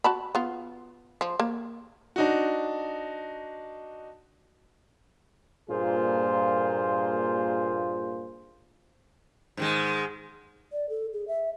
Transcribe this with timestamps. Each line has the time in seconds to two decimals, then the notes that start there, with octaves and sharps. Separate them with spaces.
0.04 F#4 A5 B5
0.35 B3 F4
1.21 F3
1.40 A#3
2.16 D4 D#4 F#4
5.70 G2 A#2 A#3 F4 G#4 C5
9.57 G#2 D#3 G#3
10.72 D5
10.89 A4
11.13 G#4
11.28 E5